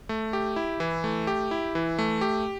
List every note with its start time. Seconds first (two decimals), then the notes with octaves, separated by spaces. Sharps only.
0.09 A3
0.33 G4
0.56 E4
0.80 E3
1.04 A3
1.27 G4
1.51 E4
1.75 E3
1.98 A3
2.21 G4